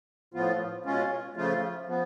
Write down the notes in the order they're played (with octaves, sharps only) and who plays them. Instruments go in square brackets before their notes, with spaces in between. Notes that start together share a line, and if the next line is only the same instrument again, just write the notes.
[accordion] A2 F3 B3 F4
B2 G#3 C#4 F4
C#3 F3 A3 F4
F3 B3